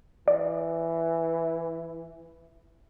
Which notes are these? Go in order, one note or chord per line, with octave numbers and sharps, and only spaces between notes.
E3 D5